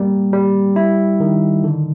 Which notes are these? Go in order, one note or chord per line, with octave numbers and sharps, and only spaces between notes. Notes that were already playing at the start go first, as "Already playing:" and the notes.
Already playing: G3 A#3
G3
E4
D#3
D3